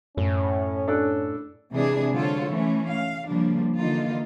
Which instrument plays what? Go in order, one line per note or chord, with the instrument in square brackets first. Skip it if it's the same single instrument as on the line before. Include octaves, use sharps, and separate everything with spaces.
[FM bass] F#2 [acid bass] A2 [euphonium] C#4
[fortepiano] D4 A4 F#6
[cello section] C3 E3 G#3 D4 G#4
D3 F#3 F4 A4 C5 C#5
E3 A3 C#4
F5
C#3 F3 G3 A#3 D4
D3 E3 A#3 D#4 F4